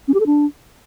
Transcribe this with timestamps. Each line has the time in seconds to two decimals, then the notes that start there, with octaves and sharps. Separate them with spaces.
0.08 C#4
0.14 G4
0.20 A4
0.26 D4